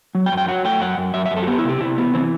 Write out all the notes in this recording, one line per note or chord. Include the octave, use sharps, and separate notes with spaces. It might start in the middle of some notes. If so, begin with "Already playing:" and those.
F#3
G5
F#2
G5
F#3 F#5
A3 G5
F#2 F#5
F#2
F#2 E5
E5
F#2
A4
F#4
B3 G4
E4
C3 G4
C3 E4
B3
E3 C4